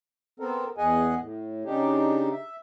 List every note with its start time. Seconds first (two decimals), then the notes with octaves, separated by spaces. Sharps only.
0.40 B3 C4 A4 A#4
0.78 E2 G#4 D#5 F#5 G#5
1.20 A2
1.65 C#3 D4 D#4 G4
2.32 E5